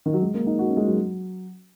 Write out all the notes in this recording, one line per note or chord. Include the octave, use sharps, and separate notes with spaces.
D#3
F#3
G#3
A#3
D#4
F#4
C#4
G#3
F#3